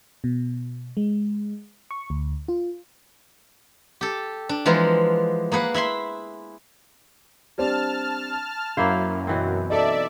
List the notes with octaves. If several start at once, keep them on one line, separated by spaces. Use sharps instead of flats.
B2
G#3
C#6
D2
F4
G4 A4
D4
E3 F3 G#3 B3 A#4
A#3 G#4 B4 F#5
E4 E5 B5 C6
G3 C4 D4 A5 F6
F#2 A#3 E4 C5 F5
B2 E3 C4
D#4 A4 D5 E5